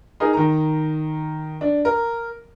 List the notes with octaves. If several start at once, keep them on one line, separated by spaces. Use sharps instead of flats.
D#4 G#4 A#4
D#3 A#5
D4
A#4